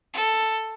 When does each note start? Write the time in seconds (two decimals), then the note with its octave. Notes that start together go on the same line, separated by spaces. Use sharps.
0.13 A4